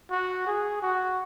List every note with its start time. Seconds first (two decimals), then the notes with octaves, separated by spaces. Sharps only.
0.10 F#4
0.46 G#4
0.82 F#4